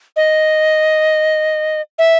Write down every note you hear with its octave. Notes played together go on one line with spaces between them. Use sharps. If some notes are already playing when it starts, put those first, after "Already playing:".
D#5
E5